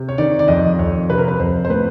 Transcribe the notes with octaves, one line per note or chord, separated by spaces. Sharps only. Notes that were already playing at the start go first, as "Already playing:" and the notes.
Already playing: C3
C#5
D#3 D5
D5
F2 D#5
F2 C#5
C3 B4
A#4
B4
F2 C5
C5
A2 B4